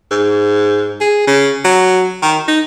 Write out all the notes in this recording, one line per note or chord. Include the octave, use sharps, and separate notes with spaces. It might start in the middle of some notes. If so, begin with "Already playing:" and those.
G#2
G#4
C#3
F#3
D#3
D#4